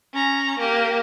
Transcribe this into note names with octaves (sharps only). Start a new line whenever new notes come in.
C#4 A#5
A#3 G4